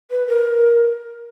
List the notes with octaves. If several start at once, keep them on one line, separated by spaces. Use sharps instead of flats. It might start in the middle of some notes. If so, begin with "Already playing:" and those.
B4
A#4